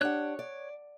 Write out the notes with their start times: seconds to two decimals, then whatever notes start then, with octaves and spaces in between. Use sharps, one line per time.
0.01 D4 G4 C#5 F#5 F#6
0.39 D5